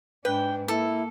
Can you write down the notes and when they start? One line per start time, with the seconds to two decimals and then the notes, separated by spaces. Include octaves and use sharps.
0.25 G#2 D4 B4 G5
0.68 A#3 E4 A4